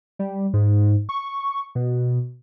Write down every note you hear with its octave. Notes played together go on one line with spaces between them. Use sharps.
G3
G#2
C#6
B2